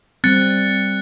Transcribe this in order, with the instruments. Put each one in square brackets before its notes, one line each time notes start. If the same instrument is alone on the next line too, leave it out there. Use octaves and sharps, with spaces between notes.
[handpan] G3 C4 [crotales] F#6 A6 C#7